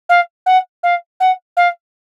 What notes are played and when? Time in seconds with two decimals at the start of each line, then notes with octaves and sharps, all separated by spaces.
0.09 F5
0.46 F#5
0.83 F5
1.20 F#5
1.57 F5